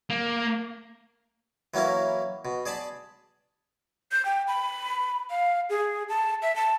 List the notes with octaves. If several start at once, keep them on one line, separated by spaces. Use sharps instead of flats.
A#3
E3 F#3 A#3 C#4 E4
B2
G#4 D5 A5 B5
G6
G5
B5
F5
G#4
A5
E5
A5